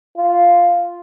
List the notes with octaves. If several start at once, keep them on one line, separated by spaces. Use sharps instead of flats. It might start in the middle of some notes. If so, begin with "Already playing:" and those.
F4